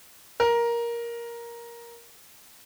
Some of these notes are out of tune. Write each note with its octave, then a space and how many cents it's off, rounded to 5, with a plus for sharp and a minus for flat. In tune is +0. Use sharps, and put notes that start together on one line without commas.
A#4 +10